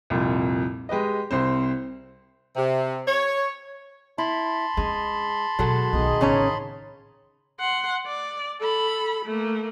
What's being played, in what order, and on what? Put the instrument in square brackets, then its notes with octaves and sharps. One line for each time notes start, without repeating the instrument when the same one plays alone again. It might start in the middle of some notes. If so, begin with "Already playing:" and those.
[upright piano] C2 F2 A#2
G#3 G4 B4 D#5
C2 C4 C5
[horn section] C3
C#5
[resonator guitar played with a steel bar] E4 [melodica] A5 B5 C6
[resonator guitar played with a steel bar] G#3 [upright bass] C#4 D4
[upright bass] B2 D#3 [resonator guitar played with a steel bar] F#3 G#3 A4
[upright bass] B1 B3 [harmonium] D#3 G#4 D#5
[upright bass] A1 [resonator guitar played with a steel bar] C#3 C#4 A#5
[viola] F#5 C6
D5
A4 B5
A3 A#3